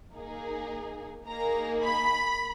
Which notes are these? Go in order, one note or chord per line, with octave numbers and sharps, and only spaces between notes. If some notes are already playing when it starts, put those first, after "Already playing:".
A#3 D#4 G#4
A#3 D#4 G#4 A#5
B5